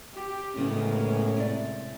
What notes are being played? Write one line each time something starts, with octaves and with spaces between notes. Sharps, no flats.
G4
A2 C#3 G#3 A#3 B3 C#4
C3 D5